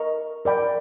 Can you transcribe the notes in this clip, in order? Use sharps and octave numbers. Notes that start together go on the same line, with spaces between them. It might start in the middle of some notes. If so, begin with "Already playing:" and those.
Already playing: A#4 D#5 A#5 C#6
A#4 D5 G5 B5